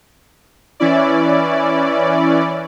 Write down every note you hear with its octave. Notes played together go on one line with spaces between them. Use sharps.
E3 C#4 E4 D5